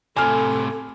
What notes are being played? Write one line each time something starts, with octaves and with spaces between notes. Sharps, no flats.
A2 C3 A4 G#5 F6